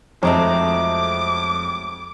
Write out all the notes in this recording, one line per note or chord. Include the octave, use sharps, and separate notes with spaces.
F2 F#3 G#3 A3 D6